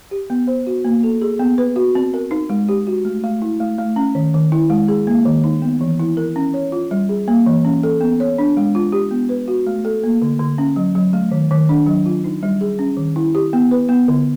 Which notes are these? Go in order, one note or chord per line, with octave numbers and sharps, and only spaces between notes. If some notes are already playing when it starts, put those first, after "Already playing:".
G4
B3
C5
F#4
A#3
A4
G#4
B3
B4
F#4
C4
A#4
D#4
G#3
G4
F#4
A3
A3
E4
A3
A3
C#4
D#3
D#3
E4
G#3
G#4
A#3
D#3
D#4
B3
E3
E4
A#4
C#4
C#5
F4
G3
G#4
A#3
E3
C#4
A4
B3
C#5
D4
G#3
F4
G4
B3
B4
F#4
A3
A4
A#3
D3
D3
C#4
F#3
F#3
A3
D#3
D#3
D4
F#3
F4
D#4
G3
G#4
C#4
D#3
E4
G4
B3
B4
B3
D3